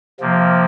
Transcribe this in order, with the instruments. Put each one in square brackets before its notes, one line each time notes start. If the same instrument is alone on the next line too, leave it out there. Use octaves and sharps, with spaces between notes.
[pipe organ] C3 F3 A#3